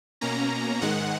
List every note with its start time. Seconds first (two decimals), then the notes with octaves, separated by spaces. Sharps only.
0.21 B2 A#3 C#4 A#5
0.81 G#2 D#3 G#3 F#5